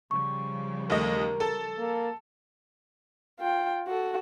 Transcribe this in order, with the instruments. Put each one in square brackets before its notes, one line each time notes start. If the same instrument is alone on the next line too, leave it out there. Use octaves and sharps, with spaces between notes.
[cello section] C#3 F3 G3 [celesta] C#6
[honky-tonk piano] D#2 A3 D#5 [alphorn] A#4
[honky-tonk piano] A4 A5
[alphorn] A#3
[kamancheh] F4 G5
F#4 A4